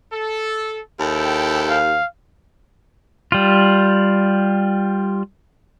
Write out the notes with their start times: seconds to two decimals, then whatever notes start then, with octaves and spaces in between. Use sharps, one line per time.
0.13 A4
0.99 D#2 E4 A4 G5
1.69 F5
3.32 G3 F4